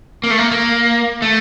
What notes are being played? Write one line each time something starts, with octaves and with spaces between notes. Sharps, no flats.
A#3
A3
A#3
A#3
A3